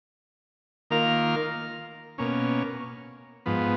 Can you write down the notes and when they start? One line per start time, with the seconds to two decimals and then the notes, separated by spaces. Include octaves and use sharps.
0.90 D#3 A#3 F4 A#4 F5
2.18 B2 A#3 C#4
3.46 G#2 F3 B3